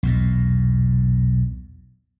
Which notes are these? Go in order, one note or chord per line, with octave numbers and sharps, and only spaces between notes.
B1 E2 A#2